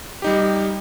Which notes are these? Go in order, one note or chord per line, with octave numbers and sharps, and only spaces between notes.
G3 D#4 G4